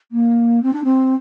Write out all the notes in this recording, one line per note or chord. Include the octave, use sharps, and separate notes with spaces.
A#3
C4
D4
C4